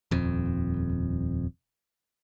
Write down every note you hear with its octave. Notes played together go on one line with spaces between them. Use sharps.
D#1 F2